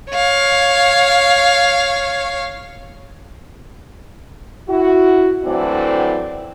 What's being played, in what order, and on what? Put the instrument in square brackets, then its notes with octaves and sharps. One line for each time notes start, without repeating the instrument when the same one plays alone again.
[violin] C#5 F5
[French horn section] E4 F#4
A2 D3 E3 F#3 C4 D5